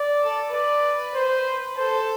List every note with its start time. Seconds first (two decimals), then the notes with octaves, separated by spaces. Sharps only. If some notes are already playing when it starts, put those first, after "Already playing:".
Already playing: D5
0.22 A4
0.53 B4 D5
1.15 C5
1.77 A4 C5